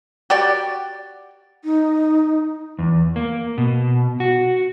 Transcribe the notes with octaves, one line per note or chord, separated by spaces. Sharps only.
F#4 G4 D5
D#4
E2
A#3
B2
F#4